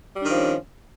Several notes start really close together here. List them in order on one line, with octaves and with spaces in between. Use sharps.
G3 D4 D#3 F3 C#4